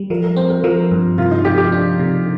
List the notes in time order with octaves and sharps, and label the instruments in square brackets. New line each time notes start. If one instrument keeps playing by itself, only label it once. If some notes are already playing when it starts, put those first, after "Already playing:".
Already playing: [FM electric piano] G3
[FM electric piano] F3 [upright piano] A#4
[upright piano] A#4
[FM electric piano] C4 [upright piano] C5
[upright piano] A#4
[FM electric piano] F3 [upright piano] A#4
[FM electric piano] G2
[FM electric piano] C3 [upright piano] F4
[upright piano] D#4
[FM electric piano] C3 [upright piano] G4
[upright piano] G4
[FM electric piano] D4
C3